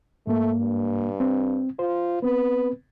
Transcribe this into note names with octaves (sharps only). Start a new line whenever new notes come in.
G#2 A3 A#3
G2
C4
F4 C5
B3 C4 B4